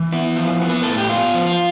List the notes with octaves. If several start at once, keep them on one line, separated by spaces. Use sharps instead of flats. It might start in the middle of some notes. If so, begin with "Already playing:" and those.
Already playing: E3
B3 E4
F3
B3
B4
A2 A4
G4
B3 F4
F3
F4